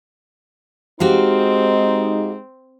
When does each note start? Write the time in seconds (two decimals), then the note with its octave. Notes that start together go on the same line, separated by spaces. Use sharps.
1.00 G#3 C4 D#4 F#4 G4 F5